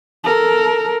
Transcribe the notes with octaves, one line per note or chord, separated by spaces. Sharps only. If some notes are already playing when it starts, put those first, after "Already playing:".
A4 A#4